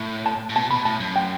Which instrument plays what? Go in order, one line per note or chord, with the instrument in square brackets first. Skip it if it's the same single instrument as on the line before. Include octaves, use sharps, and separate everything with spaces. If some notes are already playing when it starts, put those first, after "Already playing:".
Already playing: [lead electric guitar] A2
[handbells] A5
[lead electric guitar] A2
[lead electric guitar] B2 [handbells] A5
[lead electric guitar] B2 [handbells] B5
[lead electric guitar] A2 [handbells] A5
[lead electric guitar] F#2
[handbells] G5